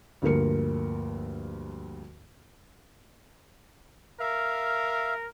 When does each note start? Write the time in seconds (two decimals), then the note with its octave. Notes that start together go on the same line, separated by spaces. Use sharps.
0.22 D2 G2 F3 A#3 A#4 C#7
4.20 A#4 E5 F5